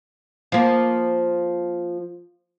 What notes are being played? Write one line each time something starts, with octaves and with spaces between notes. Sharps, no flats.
F3 A#3